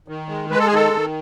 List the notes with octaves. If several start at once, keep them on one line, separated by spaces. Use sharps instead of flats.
D#3
G#3
G#3 B4
A4
G#4
D#3 A4
D#3